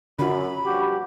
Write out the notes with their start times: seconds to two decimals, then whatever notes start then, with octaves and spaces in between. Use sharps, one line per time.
0.19 F#2 D3 F4 B5
0.64 A#1 G2 F#4 G4